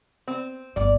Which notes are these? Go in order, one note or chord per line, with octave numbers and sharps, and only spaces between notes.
C4
G1 A#2 D5